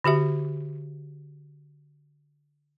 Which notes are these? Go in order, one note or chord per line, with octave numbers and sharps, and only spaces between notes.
D3 F#4 G4 E5